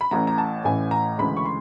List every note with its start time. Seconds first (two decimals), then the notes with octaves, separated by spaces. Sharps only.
0.01 B5
0.11 A1 A2 E3 A#5
0.27 A#5
0.38 A5
0.64 A1 A2 E3 G#5
0.91 A#5
1.18 D2 C#3 E3 G#3 B5
1.37 C#6
1.45 C6